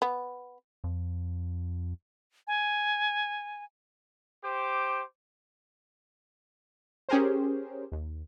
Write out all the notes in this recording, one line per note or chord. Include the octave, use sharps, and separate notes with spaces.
B3
F2
G#5
G4 C5 D6
C#4 G4 G#4 A#4 C5
D#2